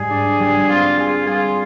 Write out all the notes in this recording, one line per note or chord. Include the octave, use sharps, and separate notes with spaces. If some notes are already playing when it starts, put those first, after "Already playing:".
Already playing: G#2 G3 G#4
D4
G3
C4 F4
F4 G#4
F4 G#4